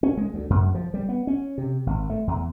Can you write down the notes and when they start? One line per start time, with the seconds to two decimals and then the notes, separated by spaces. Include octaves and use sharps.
0.03 C#4
0.17 G#3
0.34 D2
0.50 F#2
0.75 F3
0.94 G3
1.09 B3
1.27 C#4
1.58 C3
1.87 G#1
2.10 A3
2.27 E2